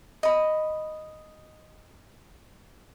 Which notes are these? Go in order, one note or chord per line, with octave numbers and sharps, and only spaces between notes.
D#5 B5